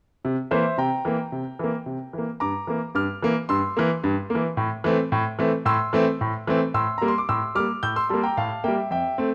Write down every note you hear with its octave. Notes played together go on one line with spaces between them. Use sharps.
C3
E3 A#3 C5 E5
C3 G5 A#5
E3 A#3
C3
E3 A#3
C3
E3 A#3
G2 A#5 D6
E3 A#3
G2 D6 F6
E3 A#3
G2 C6 E6
E3 A#3
G2
A#3
E3
A2
E3 A3 C4
A2
E3 A3 C4
A2 C6 E6
E3 A3 C4
A2
E3 A3 C4
A2 C6 E6
G3 A#3 A#5
C6
D6
A2 C6 E6
G3 A#3 D6 F6
A2 E6 G6
C6 E6
G3 A#3 A5 C6
G5 A#5
A2 F5 A5
G3 A#3 E5 G5
F2 E5 G5
A3 C4